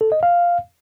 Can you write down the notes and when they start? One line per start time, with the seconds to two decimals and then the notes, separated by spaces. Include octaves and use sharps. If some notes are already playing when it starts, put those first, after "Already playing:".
0.01 A4
0.12 D#5
0.23 F5